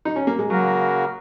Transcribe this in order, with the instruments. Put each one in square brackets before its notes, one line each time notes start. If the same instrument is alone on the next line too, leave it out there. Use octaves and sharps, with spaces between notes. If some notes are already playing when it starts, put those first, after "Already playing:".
[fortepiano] D#4
C#4
A#3
G#3
[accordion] C#3 A#3 F#4 A#4 [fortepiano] F#3